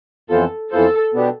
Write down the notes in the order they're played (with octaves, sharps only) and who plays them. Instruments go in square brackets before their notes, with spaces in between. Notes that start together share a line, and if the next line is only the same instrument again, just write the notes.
[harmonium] F2 E3 B3 F4 C5 [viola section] A4
[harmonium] F2 E3 B3 F4 C5 [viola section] A4
[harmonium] B2 B3 D4 G4